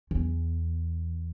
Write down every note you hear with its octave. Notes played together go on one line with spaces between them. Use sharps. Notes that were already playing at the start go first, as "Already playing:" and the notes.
E2